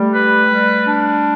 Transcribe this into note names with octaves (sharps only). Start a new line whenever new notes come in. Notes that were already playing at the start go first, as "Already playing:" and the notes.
Already playing: G3 A3
B4
G3
D4